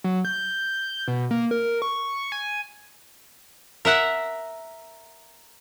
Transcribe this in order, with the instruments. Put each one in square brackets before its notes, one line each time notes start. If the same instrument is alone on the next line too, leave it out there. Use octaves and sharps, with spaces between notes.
[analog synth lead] F#3
G6
B2
A#3
A#4
C#6
G#5
[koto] A#4 E5 F#5